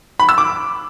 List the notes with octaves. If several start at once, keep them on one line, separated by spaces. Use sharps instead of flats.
B5
E6
D6